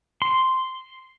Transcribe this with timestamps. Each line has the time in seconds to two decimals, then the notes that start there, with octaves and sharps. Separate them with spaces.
0.22 C6